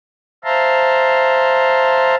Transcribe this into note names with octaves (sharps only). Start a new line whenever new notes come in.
C5 E5 F5 A5 A#5 C6